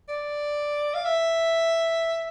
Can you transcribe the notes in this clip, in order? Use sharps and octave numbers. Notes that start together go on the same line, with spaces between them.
D5
F5
E5